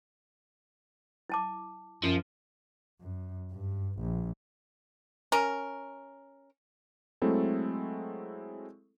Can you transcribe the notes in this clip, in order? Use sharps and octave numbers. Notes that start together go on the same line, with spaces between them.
E4 A5 D6
F#2 F3 F4
F#2
G2
A#1
C#4 A#4
F#3 G#3 A3 C4 E4 A4